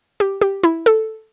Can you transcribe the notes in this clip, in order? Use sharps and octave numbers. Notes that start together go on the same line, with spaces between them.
G4
G4
E4
A4